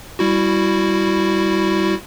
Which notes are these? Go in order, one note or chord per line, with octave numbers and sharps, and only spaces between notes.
G3 E4 F#4